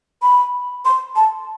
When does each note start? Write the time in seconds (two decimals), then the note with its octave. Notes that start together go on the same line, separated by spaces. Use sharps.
0.22 B5
0.85 C6
1.16 A5